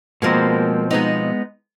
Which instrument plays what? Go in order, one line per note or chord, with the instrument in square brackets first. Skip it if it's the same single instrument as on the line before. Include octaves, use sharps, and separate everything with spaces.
[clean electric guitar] B2 F3 C4 [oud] G#3 A#3 A#4
[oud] G#3 B3 D#4